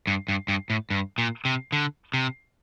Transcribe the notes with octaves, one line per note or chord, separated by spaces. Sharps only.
G2
G2
G2
A2
G2
A#2
C3
D3
C3